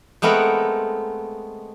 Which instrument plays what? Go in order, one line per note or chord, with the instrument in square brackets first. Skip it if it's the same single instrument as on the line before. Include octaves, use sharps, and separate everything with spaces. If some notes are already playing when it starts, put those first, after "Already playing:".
[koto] G#3 A3 B3 C4 A#4 F#5